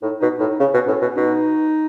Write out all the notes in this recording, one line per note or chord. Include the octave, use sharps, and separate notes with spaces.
A2 D#4
B2 D#4
A2 D#4
D#4
C#3 C#4
B2
A2 C#4
B2
B2 D#4